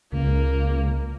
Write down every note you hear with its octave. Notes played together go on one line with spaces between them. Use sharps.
C#2 A#3